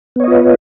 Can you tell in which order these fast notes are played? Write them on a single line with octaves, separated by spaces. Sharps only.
B3 C#5 D#5 F4 B4